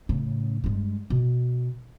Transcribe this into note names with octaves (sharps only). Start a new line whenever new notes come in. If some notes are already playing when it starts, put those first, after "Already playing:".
A2 C#3
G2 G#3
B2